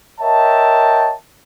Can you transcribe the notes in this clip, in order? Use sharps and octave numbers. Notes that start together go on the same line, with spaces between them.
A#4 C#5 D#5 E5 G5 A5